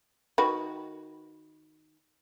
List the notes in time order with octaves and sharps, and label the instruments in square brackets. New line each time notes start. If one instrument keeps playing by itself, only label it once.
[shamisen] D#3 F#4 B4